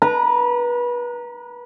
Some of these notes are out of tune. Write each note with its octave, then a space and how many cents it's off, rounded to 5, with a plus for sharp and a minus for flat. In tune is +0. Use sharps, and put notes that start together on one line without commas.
B4 -30 A#5 +0